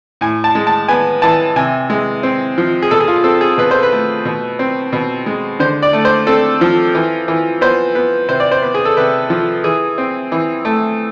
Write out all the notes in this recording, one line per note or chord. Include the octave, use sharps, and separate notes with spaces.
A2 G#5
A5
G#3
A5
B3 G#5
E3 A5
C3 G#5
G#3
C4
F3
G#4
B2 A4
G#4
F4
C4 A4
G#4
B2 B4
C5
B4
A3
B2
C4
B2
G#3
D3 C5
D5
A3
C5
C4 A4
F3
E3
E3
B3 C5
B3
C3 C5
D5
C5
B3
G#4
A4
C3 B4
F3
E3 G#4
C4
E3
A3